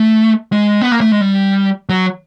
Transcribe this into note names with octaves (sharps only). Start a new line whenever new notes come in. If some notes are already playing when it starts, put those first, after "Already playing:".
Already playing: A3
G#3
B3
A#3
A3
G#3
G3
F#3